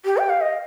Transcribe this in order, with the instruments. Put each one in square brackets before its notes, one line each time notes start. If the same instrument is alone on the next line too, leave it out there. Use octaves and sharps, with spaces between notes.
[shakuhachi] G4
G5
F5
D#5